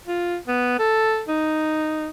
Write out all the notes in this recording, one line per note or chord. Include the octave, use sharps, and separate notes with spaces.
F4
B3
A4
D#4